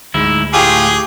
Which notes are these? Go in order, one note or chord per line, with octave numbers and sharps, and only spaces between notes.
D2 G#2 E4
A2 F4 G4 G#4